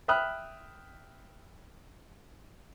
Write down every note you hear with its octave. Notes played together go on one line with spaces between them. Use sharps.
E5 G5 B5 D#6 F6 F#6